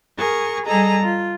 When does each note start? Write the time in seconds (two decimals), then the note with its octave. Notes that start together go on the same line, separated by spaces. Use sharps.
0.18 G#4 A#4 C#6
0.65 G3 G#4 A4 D#5 A#5
1.03 F4